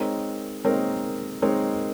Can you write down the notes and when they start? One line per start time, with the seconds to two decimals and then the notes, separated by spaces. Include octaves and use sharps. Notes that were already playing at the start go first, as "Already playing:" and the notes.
Already playing: G#3 C4 D#4 A#4 C#5
0.65 G#3 C4 D#4 A#4 C#5
1.42 G#3 C4 D#4 A#4 C#5